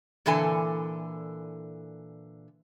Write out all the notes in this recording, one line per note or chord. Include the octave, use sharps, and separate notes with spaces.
A#2 D3 E3 A4 G#5 A5